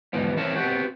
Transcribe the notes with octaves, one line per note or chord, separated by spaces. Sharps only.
D2 G#2 E3 F3 B3
E3 A3 C4 E4 A#4 C#5
B3 C4 F#4 G4